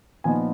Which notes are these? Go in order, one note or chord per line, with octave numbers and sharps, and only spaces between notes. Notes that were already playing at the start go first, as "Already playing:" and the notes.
A#2 F3 B3 D#4 G#5